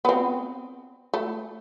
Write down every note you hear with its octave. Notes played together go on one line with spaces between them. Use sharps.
B3 C4
A3